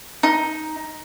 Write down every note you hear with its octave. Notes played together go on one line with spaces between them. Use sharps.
D#4